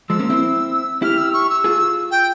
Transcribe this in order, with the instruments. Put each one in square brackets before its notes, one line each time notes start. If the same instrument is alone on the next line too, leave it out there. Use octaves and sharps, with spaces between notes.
[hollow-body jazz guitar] F3 G#3 [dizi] E6
[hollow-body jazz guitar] A#3 C#4
C4 E4
[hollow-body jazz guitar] E4 G4 [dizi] F6
[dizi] E6
C#6
E6
[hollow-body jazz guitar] F4 G#4
[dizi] G5